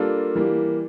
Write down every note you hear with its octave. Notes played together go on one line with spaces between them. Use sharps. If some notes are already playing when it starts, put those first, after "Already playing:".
Already playing: G3 A#3 D4 F4 A4
E3 G3 A#3